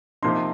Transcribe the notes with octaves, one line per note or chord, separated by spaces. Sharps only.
C3 F3 A#3 D#4 C6